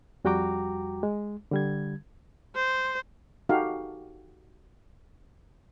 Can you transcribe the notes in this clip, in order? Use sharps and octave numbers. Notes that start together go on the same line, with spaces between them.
F2 G3 F#4 G5 A#5 D6
G#3
D3 G3 G#6
C5
D#4 F#4 G4 A4 F5